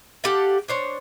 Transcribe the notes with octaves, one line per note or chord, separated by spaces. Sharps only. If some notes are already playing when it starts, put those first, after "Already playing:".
G4 A4 F5 F#5
D4 C5 C#5